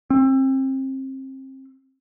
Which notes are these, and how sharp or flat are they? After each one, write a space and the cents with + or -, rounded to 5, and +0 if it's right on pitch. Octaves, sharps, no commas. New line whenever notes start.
C4 +30